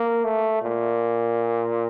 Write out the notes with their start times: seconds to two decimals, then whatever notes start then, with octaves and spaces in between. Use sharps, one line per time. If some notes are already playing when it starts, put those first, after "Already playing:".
Already playing: A#3
0.24 A3
0.62 A#2